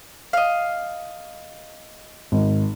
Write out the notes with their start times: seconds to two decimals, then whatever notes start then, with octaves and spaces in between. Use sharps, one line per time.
0.33 D#5 F5
2.32 G#1